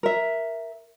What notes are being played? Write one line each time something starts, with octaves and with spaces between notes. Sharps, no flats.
A#4 E5